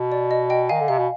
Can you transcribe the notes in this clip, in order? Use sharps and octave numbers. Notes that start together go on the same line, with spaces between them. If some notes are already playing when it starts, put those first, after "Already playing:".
Already playing: B2
D5
D#5
D#5 G5
D#3 F5 G#5
D3
C3 F5
B2